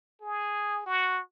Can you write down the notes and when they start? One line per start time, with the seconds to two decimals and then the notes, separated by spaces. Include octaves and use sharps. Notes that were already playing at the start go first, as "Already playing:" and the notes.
0.21 G#4
0.86 F#4